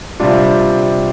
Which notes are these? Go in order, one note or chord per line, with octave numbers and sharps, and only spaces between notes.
C3 G3 D4 F4